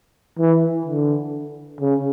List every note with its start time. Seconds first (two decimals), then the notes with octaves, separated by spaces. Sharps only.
0.39 E3
0.86 D3
1.81 C#3